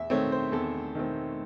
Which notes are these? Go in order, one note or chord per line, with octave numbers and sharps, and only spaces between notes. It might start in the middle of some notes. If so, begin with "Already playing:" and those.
Already playing: E2 E5
D#3 A3 C4 C#5
C5
E2 A4
D#3 A3 C4